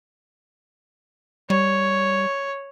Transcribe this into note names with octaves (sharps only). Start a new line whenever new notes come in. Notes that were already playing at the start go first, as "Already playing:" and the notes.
G3 C#5